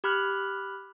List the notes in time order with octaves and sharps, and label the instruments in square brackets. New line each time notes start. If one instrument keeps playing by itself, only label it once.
[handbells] G4 B5 F6 F#6